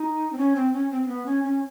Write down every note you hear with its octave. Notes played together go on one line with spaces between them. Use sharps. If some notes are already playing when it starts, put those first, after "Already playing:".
Already playing: D#4
C4
C#4
C4
C#4
C4
C4
B3
C#4
C#4